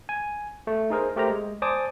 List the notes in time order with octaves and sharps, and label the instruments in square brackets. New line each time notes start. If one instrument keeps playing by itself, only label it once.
[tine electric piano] G#5
A3
D#4 G#4 A#4 C5
A3 G4 A#4 C5 A#5
G#3
C5 D5 G#5 A5 D6 D#6